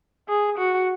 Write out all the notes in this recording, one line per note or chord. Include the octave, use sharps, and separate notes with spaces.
G#4
F#4